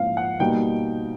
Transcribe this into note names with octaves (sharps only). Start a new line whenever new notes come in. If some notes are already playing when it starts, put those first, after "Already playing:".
Already playing: G#2 F3 A#3 C#4 E4 F5
F#5
B2 G3 A#3 D#4 G5